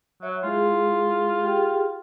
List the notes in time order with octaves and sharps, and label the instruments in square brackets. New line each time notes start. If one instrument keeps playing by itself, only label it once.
[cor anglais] F#3 [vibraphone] C#5 E5
[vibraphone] G#3 E4 G#4 [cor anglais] F4
[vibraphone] G4 G#4 G5